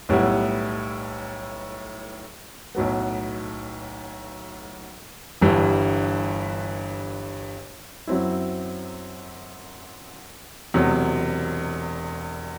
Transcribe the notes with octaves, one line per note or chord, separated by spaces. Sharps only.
B1 A2 G3 B3 E4
B1 A2 F#3 B3
G1 G2 E3 G3
F#2 F#3 C4 E4
E1 E2 C3 F#3